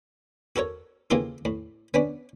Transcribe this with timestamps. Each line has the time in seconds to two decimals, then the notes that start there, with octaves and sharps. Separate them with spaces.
0.56 F#4 A4 A#4 C#5
1.10 C#3 E3 A#3 F4 G4 A4
1.45 A2
1.94 B3 C#4 D4